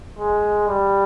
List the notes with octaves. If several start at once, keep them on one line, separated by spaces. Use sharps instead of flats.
G#3
G3